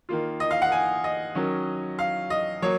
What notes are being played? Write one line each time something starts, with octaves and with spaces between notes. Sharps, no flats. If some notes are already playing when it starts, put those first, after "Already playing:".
D#3 A#3 F4
D#5
F5
F#5
G#5
D#5
D#3 F#3 C#4
F5
D#5
F#3 A#3 C#5